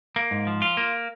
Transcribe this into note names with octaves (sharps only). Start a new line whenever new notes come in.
A#3
G#2
F3
F4
A#3